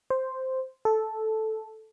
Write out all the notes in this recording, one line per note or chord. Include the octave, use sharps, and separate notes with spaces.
C5
A4